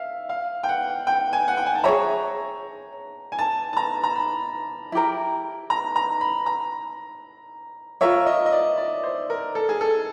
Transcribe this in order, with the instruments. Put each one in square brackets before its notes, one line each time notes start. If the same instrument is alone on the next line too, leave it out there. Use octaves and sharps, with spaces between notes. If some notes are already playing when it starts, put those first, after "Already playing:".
Already playing: [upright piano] E5 F5
F5
G5
F#5
G5
G#5
F#5
G5
G#5
A5
[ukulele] G#4 C#5 E5 [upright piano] A#5
[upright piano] G#5
A5
A5
A#5
A#5
B5
[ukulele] E4 G4 A#4
[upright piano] A#5
A#5
B5
A#5
[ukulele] F4 A#4 C#5 [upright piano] E5
[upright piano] D#5
D#5
D5
D5
C5
A#4
A4
G#4
A4